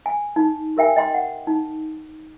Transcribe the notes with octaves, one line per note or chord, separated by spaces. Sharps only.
G#5
D#4
G4 A#4 E5 G5 G#5
D#5 G5 C6
F#5
D#4